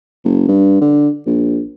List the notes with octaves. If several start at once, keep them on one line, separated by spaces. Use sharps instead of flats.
F#1
G2
D3
A#1